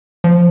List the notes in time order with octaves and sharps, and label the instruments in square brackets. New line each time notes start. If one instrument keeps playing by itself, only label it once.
[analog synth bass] F3